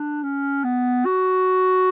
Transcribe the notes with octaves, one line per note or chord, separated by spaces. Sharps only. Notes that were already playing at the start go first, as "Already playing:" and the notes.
Already playing: D4
C#4
B3
F#4